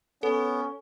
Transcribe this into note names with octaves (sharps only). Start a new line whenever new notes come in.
B3 C#4 A4